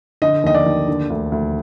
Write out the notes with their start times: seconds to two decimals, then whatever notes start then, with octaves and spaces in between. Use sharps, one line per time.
0.22 D3 D#5
0.43 D#2 D#5
0.54 D5
0.66 D#2
0.88 D3
1.10 D2
1.32 D2